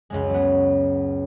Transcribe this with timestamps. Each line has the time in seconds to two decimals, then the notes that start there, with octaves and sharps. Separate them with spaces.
0.10 C#2 F#2 G#3
0.30 F#3 B3